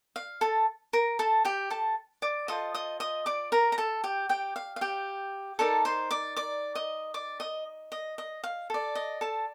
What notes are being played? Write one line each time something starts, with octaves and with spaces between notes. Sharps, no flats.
F5
A4 A5
A#4 A#5
A4 A5
G4 G5
A4 A5
D5 D6
F4 A4 C5 D#5 D#6
D#5 D#6
D#5 D#6
D5 D6
A#4 A#5
A#5
A4 A5
G4 G5
G4 G5
F5
F5
G4 G5
D#4 A4 A#4 D5 A5
C5 C6
D5 D6
D5 D6
D#5 D#6
D5 D6
D#5 D#6
D#5
D#5
F5
A4 D5
D#5
A4 A5